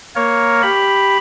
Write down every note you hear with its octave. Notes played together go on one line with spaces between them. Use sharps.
A#3 A#4 C#5
G4 B5